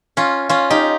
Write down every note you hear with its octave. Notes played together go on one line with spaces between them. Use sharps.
C#4 F4
C#4 F4
D#4 G4